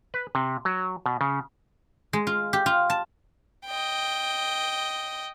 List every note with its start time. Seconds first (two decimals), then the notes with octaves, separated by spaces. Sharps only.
0.14 B4
0.35 C3
0.65 F#3
1.06 B2
1.21 C#3
2.13 G#3
2.27 F4
2.53 G4
2.66 F4
2.90 A5
3.67 D#5 G5